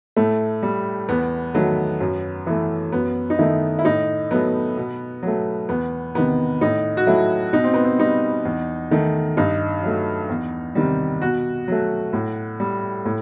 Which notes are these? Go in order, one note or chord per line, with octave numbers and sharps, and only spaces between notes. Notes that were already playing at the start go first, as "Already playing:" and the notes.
A2 A3
G3
E2 B3
D#3 F#3 A3
F#2
E3 A3
F#2 B3
D#4
D#3 A3 E4
E4
A2 D#4
F#3 A3 B3
B2
F#3 A3
E2 B3
C3 D#3 B3
A2 D#4
F#4
F#3 A3 E4
B2 D#4
C4
B3
C4
G3 D#4
E2
D#3 A3
G2 D#4
F#3 A3
E2
C3 D#3 G3
B2 F#4
F#3 A3
A2
G3
A2